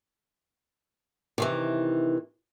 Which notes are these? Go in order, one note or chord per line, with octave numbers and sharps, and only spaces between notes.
C3 D#3 E3